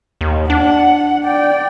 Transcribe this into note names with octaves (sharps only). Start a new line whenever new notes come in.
D#2
D4 F#5
D5 G5